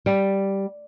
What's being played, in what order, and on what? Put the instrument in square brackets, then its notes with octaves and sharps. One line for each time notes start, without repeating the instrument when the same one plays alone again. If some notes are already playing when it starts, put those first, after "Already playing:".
[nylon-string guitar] G3